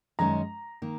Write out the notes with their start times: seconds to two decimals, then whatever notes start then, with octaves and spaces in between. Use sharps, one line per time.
0.19 F#2 D#3 G#3 C#4 A#5
0.82 D#3 A#3